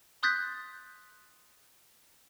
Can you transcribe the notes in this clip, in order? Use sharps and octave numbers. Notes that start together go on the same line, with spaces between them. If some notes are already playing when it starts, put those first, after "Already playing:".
C6 D#6 F#6 G6 A6 B6